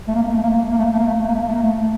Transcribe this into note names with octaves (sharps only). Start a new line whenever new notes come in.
A3
A#3
A3
A#3
A3
A#3
A3
A#3
A3
A#3
A3
A#3
A3
A#3
A3
A#3
A3
A#3
A3
A#3
A3
A#3
A3